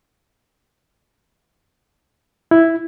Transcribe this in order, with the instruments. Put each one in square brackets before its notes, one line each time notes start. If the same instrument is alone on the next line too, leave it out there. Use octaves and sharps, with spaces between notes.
[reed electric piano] E4